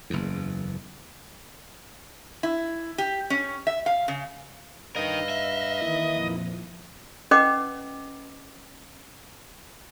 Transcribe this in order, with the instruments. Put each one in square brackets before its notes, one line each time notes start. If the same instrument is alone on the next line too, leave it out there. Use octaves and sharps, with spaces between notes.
[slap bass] F#1 E2
[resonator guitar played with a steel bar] E4
G4
C#4
E5
F5
C#3
[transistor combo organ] G2 B4 F5 [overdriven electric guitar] D#4 A#4 [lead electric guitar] D#5 [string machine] A#5 E6
[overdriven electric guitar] E5
[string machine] D#3 B4 [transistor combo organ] E3 A#3 E4
[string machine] F2 A#2 F3
[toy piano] C#4 B4 D#5 F#5 G5 D6